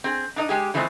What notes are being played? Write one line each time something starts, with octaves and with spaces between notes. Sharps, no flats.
C4 G#4
D4 D#4 D#5
G#3 G4 G#4
D3 E3 F3 G#3 A3 C4